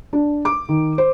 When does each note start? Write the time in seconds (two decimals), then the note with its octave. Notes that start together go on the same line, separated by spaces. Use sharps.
0.13 D4
0.45 D6
0.69 D#3
0.98 C5